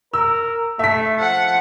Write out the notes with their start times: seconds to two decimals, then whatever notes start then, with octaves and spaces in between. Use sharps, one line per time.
0.14 A#4 E6
0.79 A3 E5 B6
1.20 F3 F#5